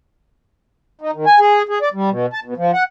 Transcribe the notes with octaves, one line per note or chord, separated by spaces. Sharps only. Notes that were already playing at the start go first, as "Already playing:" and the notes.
D#4
D#3
G#5
G#4
G#4
D5
G3
B2
A5
B2
F3
F#5